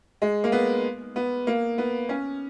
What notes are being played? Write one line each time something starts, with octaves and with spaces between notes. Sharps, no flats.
G#3
A#3
B3
B3
A#3
B3
C#4